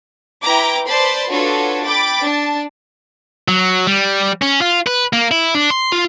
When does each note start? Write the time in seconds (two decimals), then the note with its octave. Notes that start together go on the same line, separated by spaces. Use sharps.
0.42 E4 B4 G5 A#5 D6
0.86 B4 C5 D5 A5 B5 C6
1.30 D4 F4 F#4 A4 B4 C#5
1.83 G5 B5 D6 A6
2.23 D4 A5
3.48 F#3
3.87 G3
4.42 C#4
4.61 F4
4.87 B4
5.13 A#3
5.31 E4
5.55 D4
5.70 C6
5.92 F4